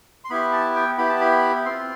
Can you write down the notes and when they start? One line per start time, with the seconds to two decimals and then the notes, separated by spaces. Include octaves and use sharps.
0.24 C6
0.30 B3 E4 G4 B5
0.53 A5
0.75 G5
0.98 B3 E4 G4 B5
1.09 A5
1.21 B5
1.65 C4 F4 C6